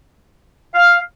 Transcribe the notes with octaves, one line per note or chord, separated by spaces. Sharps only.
F5